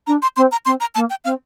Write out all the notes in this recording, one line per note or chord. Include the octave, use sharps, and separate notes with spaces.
D4 A#5
C6
C4 C6
A#5
C4 C6
A#5
A#3 A5
G5
C4 F5